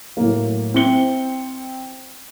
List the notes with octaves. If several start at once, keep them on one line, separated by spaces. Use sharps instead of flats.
A2 F#3 A#3
C4 E4 G5 C#7 G7